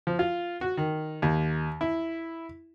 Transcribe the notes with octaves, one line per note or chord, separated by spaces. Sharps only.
F3
F4
F#4
D#3
D#2
E4